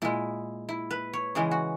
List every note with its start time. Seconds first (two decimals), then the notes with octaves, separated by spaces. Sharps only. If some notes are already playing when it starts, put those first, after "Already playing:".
0.02 A#2 G#3 E4
0.69 E4
0.91 B4
1.13 C#5
1.35 C#3 E3 G#3 G#4
1.51 F#4